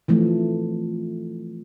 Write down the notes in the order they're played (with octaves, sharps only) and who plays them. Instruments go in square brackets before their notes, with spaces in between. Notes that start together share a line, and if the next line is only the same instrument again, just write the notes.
[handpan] E3 F3 A3